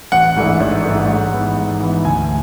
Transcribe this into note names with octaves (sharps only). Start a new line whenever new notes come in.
A1 F#5
G#2 E3 A3 D4
A1
G#2 E3 A3 D4
G#2
E3 B3
G#2
E3 B3
D2 G#5